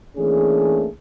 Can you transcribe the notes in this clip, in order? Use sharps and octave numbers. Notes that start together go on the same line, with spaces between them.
E3 A3 A#3 C#4 D4 G#4